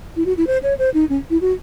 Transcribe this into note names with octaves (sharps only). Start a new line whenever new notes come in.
E4
F#4
E4
C5
C#5
C5
D#4
C#4
E4
F#4